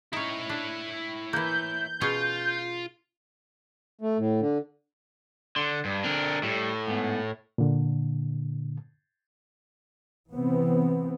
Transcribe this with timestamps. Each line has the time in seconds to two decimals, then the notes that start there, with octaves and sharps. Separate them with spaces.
0.13 C#4 D#4 E4 C#5
0.49 D4
1.33 E3 A#3 G6
2.01 B2 C#4 F4 G#4
4.01 A3
4.18 A2
4.40 D3
5.56 D3 C6
5.85 G2
6.04 D3 C4 D4 A#4
6.43 A2 G3
6.87 G#2 B3
7.58 A#2 D3
10.31 C3 E3 B3 C4